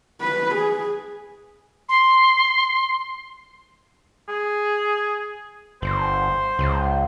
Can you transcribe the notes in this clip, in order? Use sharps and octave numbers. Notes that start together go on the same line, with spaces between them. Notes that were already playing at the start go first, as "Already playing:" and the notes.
B4
G#4
C6
G#4
G1 C5
C#2